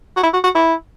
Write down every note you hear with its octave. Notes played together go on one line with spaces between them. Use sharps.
F#4
E4
F#4
F#4
E4